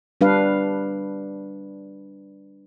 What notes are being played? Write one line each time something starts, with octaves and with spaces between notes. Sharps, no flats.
G3 D4 B4 F5